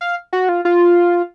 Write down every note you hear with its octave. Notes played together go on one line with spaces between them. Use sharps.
F5
F#4
F4
F4